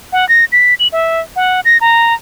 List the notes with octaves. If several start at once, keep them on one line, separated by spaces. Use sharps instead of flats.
F#5
A#6
B6
F#7
E5
F#5
A#6
A#5